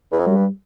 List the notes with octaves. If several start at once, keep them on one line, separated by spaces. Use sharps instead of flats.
E2
F2
F#2 G3
G2